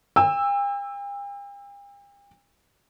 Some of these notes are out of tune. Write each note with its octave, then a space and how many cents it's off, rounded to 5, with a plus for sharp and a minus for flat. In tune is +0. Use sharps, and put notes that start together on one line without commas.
G5 +45 E6 +0